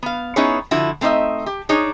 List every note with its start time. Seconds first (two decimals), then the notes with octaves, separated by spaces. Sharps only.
0.03 B3 F5
0.36 B3 C#4 D#4 E4 G#4 C#5
0.71 D3 F3 E4 F#4
1.01 A3 C4 D#4 C#5 D#5 E5
1.46 G4
1.69 D4 D#4 G#4 C#5